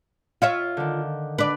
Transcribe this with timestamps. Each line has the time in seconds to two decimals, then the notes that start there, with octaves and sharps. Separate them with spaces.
0.42 F4 C#5 E5 F5
0.77 D3 D#3
1.38 D4 B4 D5